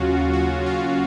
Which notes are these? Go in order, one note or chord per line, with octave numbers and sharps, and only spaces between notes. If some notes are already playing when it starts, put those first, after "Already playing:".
Already playing: D#2 C#3 F#3 C#4 F4 F#4
F#4
F4